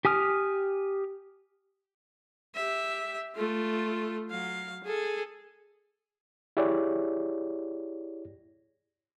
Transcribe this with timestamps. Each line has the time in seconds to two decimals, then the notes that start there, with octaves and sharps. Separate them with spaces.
0.05 G4 G#5 D#6 F6
2.55 G4 E5
3.35 A3 F4
4.29 F#3 F5
4.83 G#4 A4
6.57 E4 G4 G#4 C#5 D5